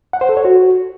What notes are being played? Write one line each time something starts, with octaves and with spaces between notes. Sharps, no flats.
F#5
C5
A4
C#5
F#4